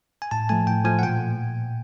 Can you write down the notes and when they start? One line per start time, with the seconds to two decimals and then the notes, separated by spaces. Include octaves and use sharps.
0.22 G#5
0.31 A2 A5
0.49 F3 A3 G#5
0.67 A2 G5
0.85 F3 A3 G#5
0.99 F#5
1.03 A#2 G5